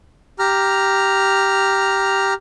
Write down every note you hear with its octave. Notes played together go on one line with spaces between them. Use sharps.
G4 A#5 F6